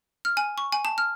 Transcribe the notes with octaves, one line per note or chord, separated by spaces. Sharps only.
F6
G#5
C#6
G#5
A5
F6